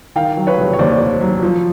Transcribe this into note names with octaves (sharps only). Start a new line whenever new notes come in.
D#3 F5 G5
F#3
B4 C#5
F1
C#5
D#2 C5 D5
D#3
F#3
F3